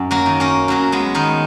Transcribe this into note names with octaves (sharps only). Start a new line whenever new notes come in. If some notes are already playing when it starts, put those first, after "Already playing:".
Already playing: F#2
F#3 A#3
D#3
A#3 C#4
F#2 F#3 A#3
G#3 B3
D#3 B3 D#4